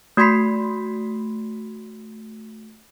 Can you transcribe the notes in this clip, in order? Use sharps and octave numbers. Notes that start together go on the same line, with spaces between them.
A3 F#4 B5 C6 B6 C7